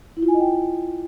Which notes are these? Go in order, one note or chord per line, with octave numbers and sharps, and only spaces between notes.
E4
F4
G#5
D#5
G5